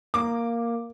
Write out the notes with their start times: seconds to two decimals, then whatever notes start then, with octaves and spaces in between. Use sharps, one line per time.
0.14 A#3 D6